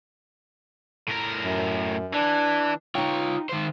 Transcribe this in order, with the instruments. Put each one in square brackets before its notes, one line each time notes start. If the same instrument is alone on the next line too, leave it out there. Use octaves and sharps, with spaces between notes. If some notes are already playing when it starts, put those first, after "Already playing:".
[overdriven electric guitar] A2 A#4
[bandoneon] F#2
[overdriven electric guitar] E3 [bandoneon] D4
[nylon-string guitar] D#4 G5 [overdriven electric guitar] F4 C#5
[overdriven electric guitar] D#3 C5